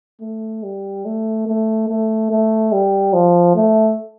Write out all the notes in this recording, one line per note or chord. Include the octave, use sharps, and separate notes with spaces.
A3
G3
A3
A3
A3
A3
G3
F3
A3